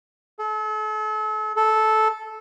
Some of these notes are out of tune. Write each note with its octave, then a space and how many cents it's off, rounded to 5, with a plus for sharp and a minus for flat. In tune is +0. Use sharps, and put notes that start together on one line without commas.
A4 -40
A4 -10